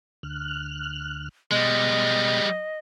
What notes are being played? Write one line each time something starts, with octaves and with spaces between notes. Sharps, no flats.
D2 F6 F#6
B2 G3 G#3 D#5